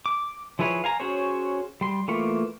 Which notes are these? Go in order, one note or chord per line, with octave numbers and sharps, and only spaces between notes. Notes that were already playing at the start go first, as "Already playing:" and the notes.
D6
F3 E4 G#4 B4 C#5
F5 G#5 A#5
C#4 F#4 G#4 C5 C#5
G3 C6
E3 A3 A#3 F4 C#6